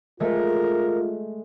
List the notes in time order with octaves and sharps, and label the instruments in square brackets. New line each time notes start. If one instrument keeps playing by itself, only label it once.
[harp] G#3 A3 [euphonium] F4 [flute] A#4